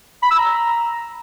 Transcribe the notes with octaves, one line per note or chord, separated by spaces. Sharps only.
B5
E6
A#5